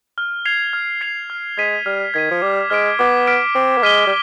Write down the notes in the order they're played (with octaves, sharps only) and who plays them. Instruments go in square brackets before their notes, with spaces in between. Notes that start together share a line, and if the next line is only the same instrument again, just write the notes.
[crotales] F6
G#6 C7 F7
F6
G#6 C7 F7
F6
[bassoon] G#3 [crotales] G#6 B6 D#7
[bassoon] G3 [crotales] F6
[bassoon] D#3 [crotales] G#6 B6 D#7
[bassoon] F3
[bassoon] G3 [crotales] D6
[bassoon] G#3 [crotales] F6 B6 D7
[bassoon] B3 [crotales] D6
[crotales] F6 B6 D7
[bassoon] C4 [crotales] D6
[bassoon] B3
[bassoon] G#3 [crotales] F6 B6 D#7 G7
[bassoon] G3